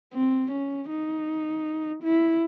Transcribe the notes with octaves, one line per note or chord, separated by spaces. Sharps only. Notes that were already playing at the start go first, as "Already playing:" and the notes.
C4
C#4
D#4
E4